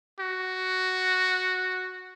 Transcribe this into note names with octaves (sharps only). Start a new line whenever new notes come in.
F#4